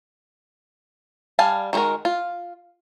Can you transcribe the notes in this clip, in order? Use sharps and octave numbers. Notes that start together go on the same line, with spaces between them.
G3 F5 G#5 A5
D#3 G#3 D#4 F#4 A#4
F4